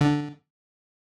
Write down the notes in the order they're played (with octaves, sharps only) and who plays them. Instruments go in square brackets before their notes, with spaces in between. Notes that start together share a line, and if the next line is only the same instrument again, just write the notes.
[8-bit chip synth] D3